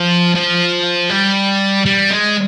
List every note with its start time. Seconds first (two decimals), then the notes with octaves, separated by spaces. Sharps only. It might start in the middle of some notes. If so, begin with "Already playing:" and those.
Already playing: F3
0.35 F3
1.10 G3
1.86 G3
2.11 G#3